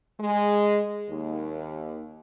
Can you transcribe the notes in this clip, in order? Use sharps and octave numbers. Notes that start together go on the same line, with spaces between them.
G#3
D#2